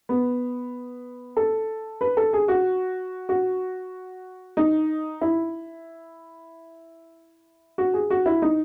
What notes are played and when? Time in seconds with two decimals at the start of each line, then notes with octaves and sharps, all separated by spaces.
0.09 B3
1.37 A4
2.01 B4
2.17 A4
2.33 G#4
2.48 F#4
3.29 F#4
4.57 D#4
5.21 E4
7.78 F#4
7.94 G#4
8.10 F#4
8.26 E4
8.42 D#4